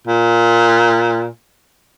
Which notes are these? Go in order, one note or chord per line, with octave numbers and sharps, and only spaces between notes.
A#2